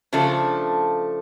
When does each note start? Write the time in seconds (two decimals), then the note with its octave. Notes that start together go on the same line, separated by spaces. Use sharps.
0.13 C#3 F3 A3 D4 A4